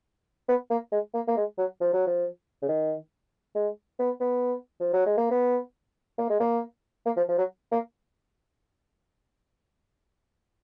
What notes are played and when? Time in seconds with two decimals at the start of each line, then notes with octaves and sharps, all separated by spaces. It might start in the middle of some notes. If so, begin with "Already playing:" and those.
0.48 B3
0.70 A#3
0.92 G#3
1.14 A#3
1.28 A#3
1.37 G#3
1.58 F#3
1.81 F3
1.93 F#3
2.07 F3
2.62 C#3
2.68 D#3
3.55 G#3
3.99 B3
4.20 B3
4.80 F3
4.93 F#3
5.06 G#3
5.17 A#3
5.31 B3
6.18 A#3
6.29 G#3
6.40 A#3
7.06 A#3
7.17 F3
7.28 F3
7.38 F#3
7.72 A#3